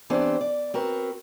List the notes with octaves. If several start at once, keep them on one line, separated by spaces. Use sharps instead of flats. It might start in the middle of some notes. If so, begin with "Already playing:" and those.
E3 B3 C4 D4 G4 C5
D5
C4 F#4 A#4 B4